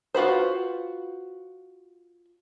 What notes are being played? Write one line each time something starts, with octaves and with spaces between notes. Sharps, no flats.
F4 F#4 B4 C5